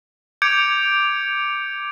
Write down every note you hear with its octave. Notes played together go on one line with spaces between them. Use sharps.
D6 G6 G#6 C#7 D7 F7